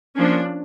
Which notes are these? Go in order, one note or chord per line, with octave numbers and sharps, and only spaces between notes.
F3 A#3 C#4 D4